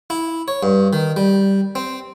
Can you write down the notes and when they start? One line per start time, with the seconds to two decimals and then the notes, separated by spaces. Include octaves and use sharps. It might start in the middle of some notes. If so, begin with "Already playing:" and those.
0.10 E4
0.48 C#5
0.63 G2
0.93 D#3
1.16 G3
1.75 C4